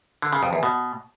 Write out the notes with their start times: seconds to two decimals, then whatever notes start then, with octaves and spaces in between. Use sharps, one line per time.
0.22 D3
0.33 C#3
0.43 F2
0.53 E2
0.63 B2